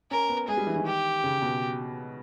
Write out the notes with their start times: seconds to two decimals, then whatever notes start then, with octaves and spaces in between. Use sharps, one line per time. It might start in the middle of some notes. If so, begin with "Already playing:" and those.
0.11 C#4 A#4
0.29 B3
0.48 G#3 G#4
0.57 G3
0.67 E3
0.76 D#3
0.86 G4
1.24 C#3
1.42 B2